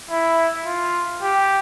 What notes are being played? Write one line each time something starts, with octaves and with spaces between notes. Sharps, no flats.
E4
F4
G4